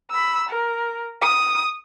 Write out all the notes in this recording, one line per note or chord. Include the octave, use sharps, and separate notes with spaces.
B5 E6
A#4
D#6